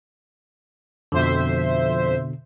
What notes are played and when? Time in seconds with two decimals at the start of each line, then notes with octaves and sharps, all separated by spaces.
1.12 F2 B2 D3 C5 E5